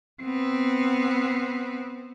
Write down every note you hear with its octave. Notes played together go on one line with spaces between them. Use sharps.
B3 C4